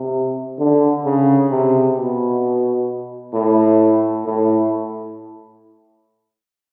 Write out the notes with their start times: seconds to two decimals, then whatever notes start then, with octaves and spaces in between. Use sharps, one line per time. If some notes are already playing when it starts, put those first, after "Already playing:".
Already playing: C3
0.59 D3
1.04 C#3
1.50 C3
1.96 B2
3.33 A2
4.25 A2